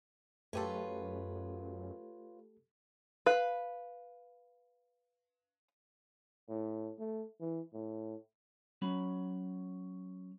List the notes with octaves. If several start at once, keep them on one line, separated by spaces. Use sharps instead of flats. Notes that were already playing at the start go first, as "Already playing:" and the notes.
F#2 A3 F4 G4 A4 B4 C#5
B4 F5
A2
A3
E3
A2
F#3 C#4 B5